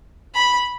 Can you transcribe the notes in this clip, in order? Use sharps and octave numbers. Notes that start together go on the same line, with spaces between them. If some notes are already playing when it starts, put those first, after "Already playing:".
B5